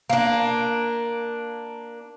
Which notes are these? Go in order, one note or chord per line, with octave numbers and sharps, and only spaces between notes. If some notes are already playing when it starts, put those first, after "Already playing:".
A#3 D4